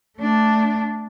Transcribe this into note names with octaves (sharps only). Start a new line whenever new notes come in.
A3 D4